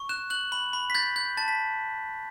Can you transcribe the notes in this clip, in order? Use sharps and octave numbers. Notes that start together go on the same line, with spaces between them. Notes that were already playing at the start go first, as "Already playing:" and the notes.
Already playing: C#6
F#6 E7
F#6 F#7
B5 F#7
B5
B6
G6 A6
G6
A5 A6
B6